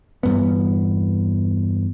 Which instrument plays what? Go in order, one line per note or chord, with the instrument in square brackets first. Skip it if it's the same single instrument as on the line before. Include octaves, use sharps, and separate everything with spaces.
[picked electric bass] E2 G2 B3